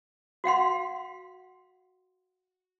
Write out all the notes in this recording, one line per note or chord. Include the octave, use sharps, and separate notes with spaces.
F#4 F5 F#5 C6